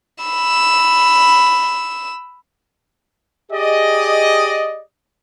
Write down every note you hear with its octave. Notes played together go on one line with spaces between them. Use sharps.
B5 E6
G4 G#4 D5 D#5